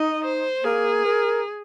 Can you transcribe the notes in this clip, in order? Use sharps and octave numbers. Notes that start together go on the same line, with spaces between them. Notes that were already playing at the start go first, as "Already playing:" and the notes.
Already playing: D#4 D#5
C5
A#3 G#4
A#4